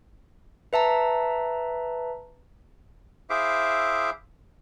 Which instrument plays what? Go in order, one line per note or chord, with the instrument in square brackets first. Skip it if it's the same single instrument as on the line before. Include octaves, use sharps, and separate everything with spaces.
[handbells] B4 E5 A5 A#5
[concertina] E4 G#4 C5 E5 F5 D6